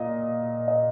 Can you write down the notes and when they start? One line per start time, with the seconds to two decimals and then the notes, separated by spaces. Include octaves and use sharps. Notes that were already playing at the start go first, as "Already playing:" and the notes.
Already playing: A#2 D#5
0.68 D#5